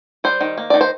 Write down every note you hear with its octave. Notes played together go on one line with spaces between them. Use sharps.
G3 C5
D#3
A#3
D#3 D5
C5